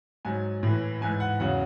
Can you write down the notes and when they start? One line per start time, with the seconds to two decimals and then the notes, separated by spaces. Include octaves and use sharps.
0.25 G#2 F#3 G#5
0.63 A2 E3
1.01 G#2 E3 G#5
1.20 F#5
1.40 E2 C#3 F#3 F#5